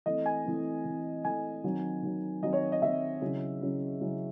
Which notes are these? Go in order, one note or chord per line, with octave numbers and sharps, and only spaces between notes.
E3 A3 C4 D#5
G#5
E3 A3 C4
E3 A3 C4
E3 A3 C4 G#5
D#3 F#3 C4
D#3 F#3 C4
D#3 F#3 C4 D#5
C#5
D#5
D#3 F#3 C4 E5
C#3 F#3 C#4 E4
C#3 F#3 C#4 E4
C#3 F#3 C#4 E4